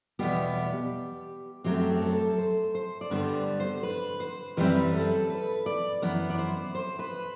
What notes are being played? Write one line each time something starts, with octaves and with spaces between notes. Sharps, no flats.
E2 B2 G3 B3 G4
F#2 F#3 A3 C4 G4
G4
A4
C5
C5
D5
G2 D3 G3 B3 C5
C5
B4
C5
F#2 E3 G3 C4 B4
A4
B4
D5
F#2 E3 B3
D5
C5
C5
B4